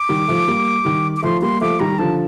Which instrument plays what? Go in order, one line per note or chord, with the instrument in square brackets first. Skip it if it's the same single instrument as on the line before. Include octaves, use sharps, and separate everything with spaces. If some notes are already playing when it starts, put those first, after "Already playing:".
Already playing: [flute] D6
[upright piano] D#3 G3
F3 A3
G3 A#3
D#3 G3
[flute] D6
[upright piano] F3 A3 [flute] C6
[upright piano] G3 A#3 [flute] C6
[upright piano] F3 A3 [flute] D6
[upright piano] D#3 G3 [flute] A#5
[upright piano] D3 F3 [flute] A5